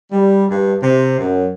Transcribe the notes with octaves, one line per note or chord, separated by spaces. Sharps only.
G3
G2
C3
F#2